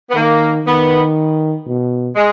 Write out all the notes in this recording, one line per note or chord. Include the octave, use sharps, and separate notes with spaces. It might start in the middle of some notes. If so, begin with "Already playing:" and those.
B3
D#3 A#3
D#3 B3
B2
G#3